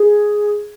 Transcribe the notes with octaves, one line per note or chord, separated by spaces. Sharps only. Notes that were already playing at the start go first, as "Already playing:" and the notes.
Already playing: G#4